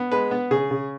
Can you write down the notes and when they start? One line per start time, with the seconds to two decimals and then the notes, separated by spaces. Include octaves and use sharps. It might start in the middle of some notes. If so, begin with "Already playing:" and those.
Already playing: B3
0.12 G#3 B4
0.31 B3
0.51 C#3 G#4
0.71 C#3